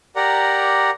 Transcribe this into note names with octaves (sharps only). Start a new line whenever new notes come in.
G4 A#4 D5 F#5 A#5